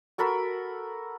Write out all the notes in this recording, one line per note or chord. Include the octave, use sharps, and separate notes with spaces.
F#4 A4 A#4 B5